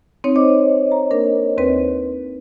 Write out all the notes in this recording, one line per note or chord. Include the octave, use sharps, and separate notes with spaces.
C4 D#4 C#5
C5 C#5 D#5 D6
A#5
A#3 D4 A#4
D#2 C4 B4